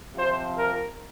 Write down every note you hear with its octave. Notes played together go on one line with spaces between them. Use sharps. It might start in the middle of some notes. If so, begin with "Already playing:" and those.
C3 F3 C5
A#4